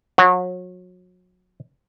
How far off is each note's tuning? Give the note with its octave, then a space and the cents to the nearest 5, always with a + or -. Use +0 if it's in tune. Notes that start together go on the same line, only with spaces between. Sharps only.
F#3 -30